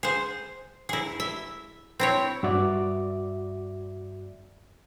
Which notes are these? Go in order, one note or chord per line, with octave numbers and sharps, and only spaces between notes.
G#4 C5
E4 G#4
E5
C4 E4 C#5
G2 F#4 D5 E5